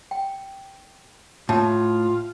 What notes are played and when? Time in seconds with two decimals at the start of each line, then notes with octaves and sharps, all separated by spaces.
0.11 G5
1.49 A2 F4 A5